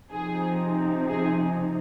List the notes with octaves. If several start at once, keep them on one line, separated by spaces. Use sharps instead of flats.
C3 F3 C4 D#4 G#4
G#4